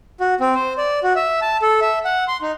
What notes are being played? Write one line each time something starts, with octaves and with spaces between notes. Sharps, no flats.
F#4
C4
C5
D5
F#4
E5
A5
A4
E5
F#5
C6
D#4